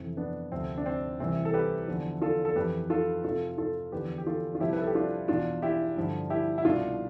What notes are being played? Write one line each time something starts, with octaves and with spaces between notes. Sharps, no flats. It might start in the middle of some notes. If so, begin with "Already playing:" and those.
Already playing: F2 C3 E3
B3 D4
D2 C3 F3 C4
D4
C4
C2 C3 E3 C4
A4
G4 B4
E2 D3 F3
F4 A4
A4
F2 E3 G4 B4
F4 A4
F2 C3 F3 F4 A4
F4 A4
E2 D3 F3 G4 B4
G4
F4 A4
F4
C2 C3 F3 E4 G4
B4
A4
G4
D4 F4
E2 B2 D4 F4
E4 G4
G2 D3 F3
E4 G4
E4
C2 B2 D4 F4